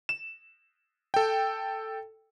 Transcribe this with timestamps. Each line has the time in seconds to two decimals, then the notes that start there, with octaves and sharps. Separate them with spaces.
0.09 E7
1.14 A4 G5